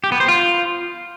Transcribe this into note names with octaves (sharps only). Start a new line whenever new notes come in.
G4
B3
C5
F4